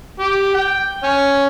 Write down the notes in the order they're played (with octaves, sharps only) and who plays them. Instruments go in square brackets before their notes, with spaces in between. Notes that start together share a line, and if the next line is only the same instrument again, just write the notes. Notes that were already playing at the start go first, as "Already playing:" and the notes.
[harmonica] G4
G5
C#4